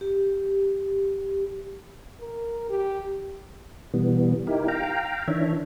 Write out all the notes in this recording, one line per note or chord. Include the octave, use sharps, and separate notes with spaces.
G4
A#4
G4
B2 E3 G3 B3
D#4 E4 G4 A#4
F5 G5 A#5
D#3 E3 D4 C#5 E5